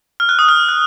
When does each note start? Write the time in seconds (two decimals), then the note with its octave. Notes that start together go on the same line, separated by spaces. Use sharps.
0.20 F6
0.29 F#6
0.39 D#6
0.49 F6
0.69 F#6